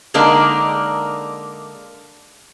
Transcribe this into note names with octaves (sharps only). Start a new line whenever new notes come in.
D3 G#3 A#3 D4 D#4 A#4